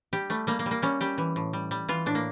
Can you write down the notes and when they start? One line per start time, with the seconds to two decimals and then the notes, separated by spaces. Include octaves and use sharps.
0.13 G3 G4
0.30 G3 A3
0.47 G3 A#3
0.59 A#3
0.66 G3
0.71 A#3
0.82 G3 C#4
1.01 G3 G4
1.18 E3
1.36 A2
1.53 G3
1.71 G3
1.89 E3 F4
2.06 A2 D4
2.15 A#3